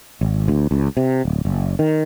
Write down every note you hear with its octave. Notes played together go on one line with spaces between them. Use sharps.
G#1
D2
C#2
C3
D1
F#1
D#3